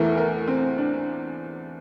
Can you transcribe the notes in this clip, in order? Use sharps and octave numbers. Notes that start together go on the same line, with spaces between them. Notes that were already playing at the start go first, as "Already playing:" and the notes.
Already playing: E2 E3 A3 A#4
A#4
C4
D4